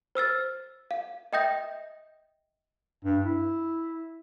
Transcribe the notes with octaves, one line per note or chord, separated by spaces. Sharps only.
C5 E6 F6 A6
F5
D#5 E5 G5 D#6 G6 A#6
G2
E4